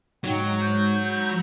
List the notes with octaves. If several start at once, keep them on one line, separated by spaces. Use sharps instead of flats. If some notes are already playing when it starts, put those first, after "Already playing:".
G#2 F#3 D#4 G5
G6
A#5 B5 E6